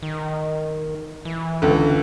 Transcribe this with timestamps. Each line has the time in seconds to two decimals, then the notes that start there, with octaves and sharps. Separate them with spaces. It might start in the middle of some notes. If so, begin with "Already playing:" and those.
0.03 D#3
1.25 E3
1.62 C#2 D3